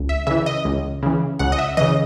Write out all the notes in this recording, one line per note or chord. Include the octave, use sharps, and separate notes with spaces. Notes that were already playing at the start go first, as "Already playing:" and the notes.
Already playing: C#2
E5
C#3 E3 E5
D#5
C#2
C#3 E3
C#2 F#5
D#5
E5
C#3 E3 D#5